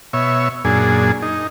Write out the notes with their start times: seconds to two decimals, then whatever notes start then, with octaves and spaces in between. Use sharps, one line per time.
0.13 B2 C#5 E5
0.65 F#2 A#2 D4 G#4
1.22 D#4